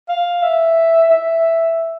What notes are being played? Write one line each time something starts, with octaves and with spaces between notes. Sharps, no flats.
F5
E5
E5